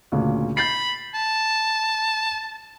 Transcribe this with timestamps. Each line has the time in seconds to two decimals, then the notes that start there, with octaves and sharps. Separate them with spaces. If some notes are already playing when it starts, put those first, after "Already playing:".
0.12 D2 A#2 C#3
0.57 B5 G6 A6 C7
1.14 A5